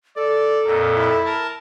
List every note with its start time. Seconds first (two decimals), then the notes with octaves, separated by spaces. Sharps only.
0.16 A4 D5
0.65 F2 A#2 A#4
0.95 E4
1.25 A#4 A5